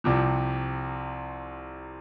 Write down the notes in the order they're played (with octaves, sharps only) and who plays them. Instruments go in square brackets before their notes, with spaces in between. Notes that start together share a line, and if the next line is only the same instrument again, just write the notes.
[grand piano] C2 C3 F3